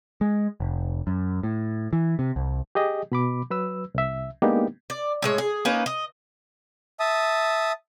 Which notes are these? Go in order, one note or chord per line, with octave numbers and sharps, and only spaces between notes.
G#3
F1
F#2
A2
E3
C3
C2
G4 G#4 D#5
B2 B5 D6
F#3 B4 E6
C2 E5
G#3 A#3 B3 D4 D#4 G4
D5
A2 G#3 C#5
G#4
A#3 C#4 D#4 B4
D#5
E5 A5 D#6